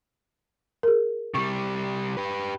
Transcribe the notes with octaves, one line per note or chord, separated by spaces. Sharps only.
G#4 A#4
C3 G3 C#6
G4 B4